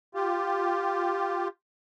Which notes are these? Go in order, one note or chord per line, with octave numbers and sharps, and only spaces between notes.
F4 G4